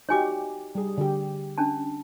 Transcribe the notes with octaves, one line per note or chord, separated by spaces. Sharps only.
D#4 F#4 G4 C#5 G#5 D6
G3 G#4
D3 G4
C#4 D4 A5